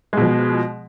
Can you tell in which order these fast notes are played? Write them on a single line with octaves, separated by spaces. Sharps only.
G#3 B2 F3